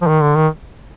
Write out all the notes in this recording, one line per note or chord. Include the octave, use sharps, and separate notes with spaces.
F3
D#3
D3
D#3